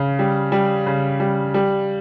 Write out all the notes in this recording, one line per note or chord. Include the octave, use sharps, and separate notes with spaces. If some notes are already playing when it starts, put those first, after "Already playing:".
Already playing: C#3
G3
G3
C#3
G3
G3